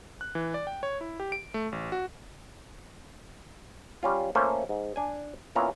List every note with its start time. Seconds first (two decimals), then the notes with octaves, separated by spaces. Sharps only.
0.21 F#6
0.35 E3
0.54 D5
0.67 G5
0.83 C#5
1.01 E4
1.20 G4
1.32 D7
1.54 A3
1.72 A1
1.92 F#4
4.03 G3 C#4 F4
4.35 A3 A#3 C#4 F4 A4 C5
4.69 G#2
4.96 D4 G#5
5.55 A#2 B3 C#4 E4 F4 A#5